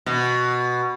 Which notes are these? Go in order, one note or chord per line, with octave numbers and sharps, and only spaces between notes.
B2